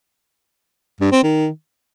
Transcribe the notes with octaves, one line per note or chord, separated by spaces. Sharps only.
G2
C4
D#3